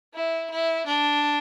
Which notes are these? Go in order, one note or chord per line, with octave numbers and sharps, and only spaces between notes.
E4
E4
D4